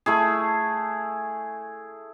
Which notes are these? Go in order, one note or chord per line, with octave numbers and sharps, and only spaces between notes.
A3 E4 G#4